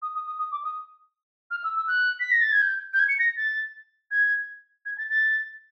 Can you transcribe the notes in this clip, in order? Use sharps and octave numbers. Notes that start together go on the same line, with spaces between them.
D#6
D#6
D#6
D#6
D6
D#6
F6
E6
E6
F#6
B6
A#6
A6
G#6
G6
G6
G#6
C#7
A#6
A6
G#6
G#6
A6
A6